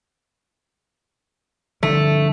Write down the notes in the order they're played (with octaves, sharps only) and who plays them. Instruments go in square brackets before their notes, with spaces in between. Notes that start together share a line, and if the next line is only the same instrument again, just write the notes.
[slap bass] D3 F3 G3 [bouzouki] A3